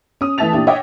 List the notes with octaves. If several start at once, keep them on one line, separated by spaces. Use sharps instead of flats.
C#4 D#6
E3 A3 E5 A5 A6 F7
A#2 D4 E4 G4
C#5 D#5 E5 F#5 G5 D6